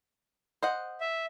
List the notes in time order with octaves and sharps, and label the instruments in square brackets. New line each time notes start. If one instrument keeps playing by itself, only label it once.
[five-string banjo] C5 D#5 F#5
[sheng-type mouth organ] E5